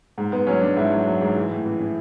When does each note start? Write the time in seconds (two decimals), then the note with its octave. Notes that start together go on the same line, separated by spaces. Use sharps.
0.18 G#2
0.32 G#2 B3
0.47 F#3 C#4
0.62 F#3 D4
0.76 G#2 E4
0.92 F#3
1.06 F#3
1.21 G#2
1.36 E3
1.51 A2
1.65 E3
1.80 E3